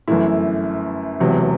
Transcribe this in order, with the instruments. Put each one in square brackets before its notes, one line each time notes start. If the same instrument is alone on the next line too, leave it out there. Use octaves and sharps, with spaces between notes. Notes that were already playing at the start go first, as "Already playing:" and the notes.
[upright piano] G1 F#2 E3 A3 E4
E1 E2 C3 F#3